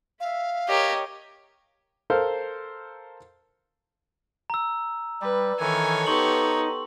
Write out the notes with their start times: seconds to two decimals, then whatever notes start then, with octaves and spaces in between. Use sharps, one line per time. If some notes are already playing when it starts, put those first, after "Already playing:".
0.20 E5 F5
0.69 G4 A#4 C#5 D#5
2.10 A4 A#4 C5 F5
4.50 A#5 E6
5.21 G3 B4
5.60 D#3 E3 A4 C#5 G#5
6.07 B3 D#4 G4 C6 C#6 F#7